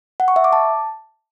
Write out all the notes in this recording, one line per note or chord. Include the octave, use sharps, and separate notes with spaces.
F#5
C#6
E5
D6
A5